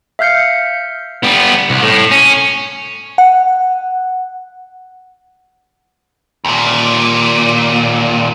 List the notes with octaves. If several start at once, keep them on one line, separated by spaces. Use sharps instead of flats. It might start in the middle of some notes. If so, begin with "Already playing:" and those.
E5 F5 F6 G6 C7 C#7
G3 B3
C2
A2
C#4
F#5
D#2 A#2